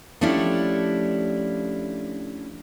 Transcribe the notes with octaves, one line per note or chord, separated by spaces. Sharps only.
F3 A3 C#4 D4 E4 G4